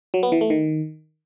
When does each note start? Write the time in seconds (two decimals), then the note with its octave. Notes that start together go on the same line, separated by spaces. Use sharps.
0.14 F#3
0.23 B3
0.32 E3
0.41 A3
0.50 D#3